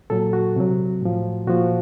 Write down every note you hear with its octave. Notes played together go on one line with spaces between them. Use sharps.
A#2 F#3 A4
F#4
C3 F#3
A2 F3
A#2 F3 F#4